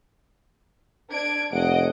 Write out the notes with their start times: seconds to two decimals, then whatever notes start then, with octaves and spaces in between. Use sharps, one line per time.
1.12 D4 G#6 D7
1.52 F1 D#5 F#5 D7